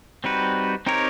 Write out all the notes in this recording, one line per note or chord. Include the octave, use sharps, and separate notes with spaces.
G3 C4 D#4 F#4 B4
C4 D#4 G4 A#4 C#5